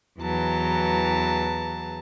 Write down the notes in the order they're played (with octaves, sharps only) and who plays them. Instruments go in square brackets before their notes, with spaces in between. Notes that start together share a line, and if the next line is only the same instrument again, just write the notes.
[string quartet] E2 E3 F#3 A5 A#5